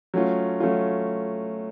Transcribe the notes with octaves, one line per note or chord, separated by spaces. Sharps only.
F#3 A3 C#4 F4
F#3 A3 C#4 F4